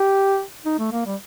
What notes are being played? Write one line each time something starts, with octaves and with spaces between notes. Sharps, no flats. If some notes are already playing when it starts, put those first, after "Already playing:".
Already playing: G4
D#4
A3
A#3
G3